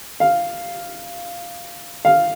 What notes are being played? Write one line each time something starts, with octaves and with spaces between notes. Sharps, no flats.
F5
F5